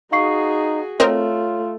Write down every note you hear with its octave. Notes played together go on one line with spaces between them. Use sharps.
D#4 F#4 G#4 F5 C#6 C7
A3 C4 F4 A#4 C#5 D#5